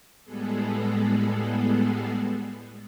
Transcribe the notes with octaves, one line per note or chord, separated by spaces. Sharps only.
A2 G3 G#3 B3 G#4 A4